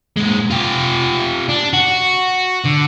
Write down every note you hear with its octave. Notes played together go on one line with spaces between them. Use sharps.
A#2 G#3
F4 G4
D4
F#4
D3